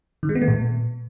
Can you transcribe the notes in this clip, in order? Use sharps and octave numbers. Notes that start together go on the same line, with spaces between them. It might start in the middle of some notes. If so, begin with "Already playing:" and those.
D#3
G#3
B3
A3
A#2